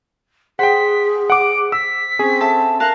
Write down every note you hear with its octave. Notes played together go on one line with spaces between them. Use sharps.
G#4 C5 F#5 G5 B6
F#5 D6 D7
E6 B6
C4 C#4 G#4
A4 E5 A5
A#4 F5 A5 F#6